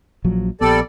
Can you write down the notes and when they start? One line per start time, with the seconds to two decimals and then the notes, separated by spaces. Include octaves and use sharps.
0.24 A#1 F3 F#3
0.61 A#1 G3 B3 A4 D5